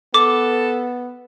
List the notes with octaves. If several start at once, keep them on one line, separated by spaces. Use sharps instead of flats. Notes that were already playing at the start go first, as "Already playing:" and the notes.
B3 A4 D6